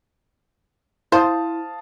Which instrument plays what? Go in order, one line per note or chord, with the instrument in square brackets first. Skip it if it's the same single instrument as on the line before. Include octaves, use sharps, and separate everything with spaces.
[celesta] E4 [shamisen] C5 [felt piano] F5 A5 D#6